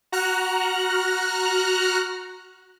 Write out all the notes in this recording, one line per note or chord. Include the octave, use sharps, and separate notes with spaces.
F#4 A#5 F6 F#6